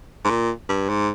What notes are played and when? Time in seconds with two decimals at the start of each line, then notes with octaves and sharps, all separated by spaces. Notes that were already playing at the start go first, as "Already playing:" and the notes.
0.24 G#2
0.29 A#2
0.69 G2
0.89 G#2